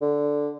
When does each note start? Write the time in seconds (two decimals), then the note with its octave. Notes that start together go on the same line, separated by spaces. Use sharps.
0.02 D3